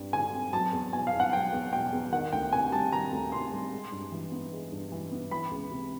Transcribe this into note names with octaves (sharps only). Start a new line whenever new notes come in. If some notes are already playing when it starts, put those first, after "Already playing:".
Already playing: G2 G3 C4
D3 G#5
C4
F#3 A5
E2
B2 G#5
F5
E2
F#5
F#3 G5
E2
B2 G5
E2
D#3 F#5
D2 G5
C3 G#5
G3 A5
D#3 A#5
D2
C3 C6
G3
G#3
G2
E3
B3
G#3
G2
E3
B3
E3 B5
C#2
C3